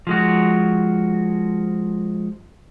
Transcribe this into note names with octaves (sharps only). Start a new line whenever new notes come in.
F3 G#3 F#4